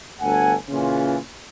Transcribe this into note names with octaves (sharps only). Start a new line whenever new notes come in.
G1 D2 A4 F#5 G#5
A#2 C#3 E3 C#4 F4